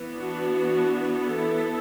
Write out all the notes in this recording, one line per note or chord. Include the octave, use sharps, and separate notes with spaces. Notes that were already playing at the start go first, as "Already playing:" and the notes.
Already playing: E3 B3
D4 F#4
E4 A4